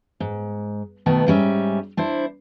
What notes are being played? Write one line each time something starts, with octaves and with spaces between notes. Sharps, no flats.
G#2
B2 D#3 A3 B3
G#2 G3 C#4 E5
D4 E4 C5